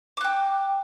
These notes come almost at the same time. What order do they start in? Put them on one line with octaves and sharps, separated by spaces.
D6 F#6 G5